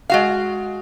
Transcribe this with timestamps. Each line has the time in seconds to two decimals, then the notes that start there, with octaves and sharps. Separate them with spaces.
0.10 G#3 F#4 F5